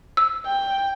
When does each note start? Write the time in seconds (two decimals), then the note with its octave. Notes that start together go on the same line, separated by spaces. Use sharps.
0.17 E6
0.46 G5